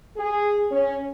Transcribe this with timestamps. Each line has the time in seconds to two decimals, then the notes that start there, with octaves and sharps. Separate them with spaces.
0.17 G#4
0.71 C#4